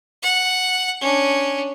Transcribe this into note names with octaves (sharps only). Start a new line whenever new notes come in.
F#5
C#4 D4